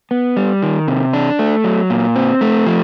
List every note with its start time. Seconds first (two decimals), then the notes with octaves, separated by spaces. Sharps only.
0.11 B3
0.37 G3
0.63 D#3
0.88 C3
1.13 D4
1.39 A3
1.64 F#3
1.90 A#2
2.16 C4
2.41 A3
2.66 F3